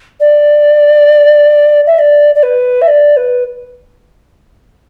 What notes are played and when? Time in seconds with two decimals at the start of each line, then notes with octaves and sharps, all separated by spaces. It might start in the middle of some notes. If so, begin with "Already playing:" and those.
0.20 D5
1.87 E5
1.98 D5
2.35 D5
2.43 B4
2.81 E5
2.87 D5
3.16 B4